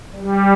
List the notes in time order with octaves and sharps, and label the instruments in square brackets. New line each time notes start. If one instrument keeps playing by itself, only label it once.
[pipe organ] G3